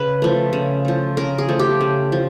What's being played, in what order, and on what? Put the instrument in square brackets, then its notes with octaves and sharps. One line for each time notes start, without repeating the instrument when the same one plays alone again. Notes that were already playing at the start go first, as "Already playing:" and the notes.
Already playing: [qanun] C#3 B4
F3 A3
C#3
F3 A3
C#3 A#4
G#4
F3 A3
G4
C#3
F3